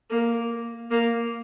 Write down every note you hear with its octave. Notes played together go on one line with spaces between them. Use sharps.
A#3
A#3